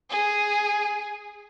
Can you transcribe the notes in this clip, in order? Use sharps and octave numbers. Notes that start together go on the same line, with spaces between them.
G#4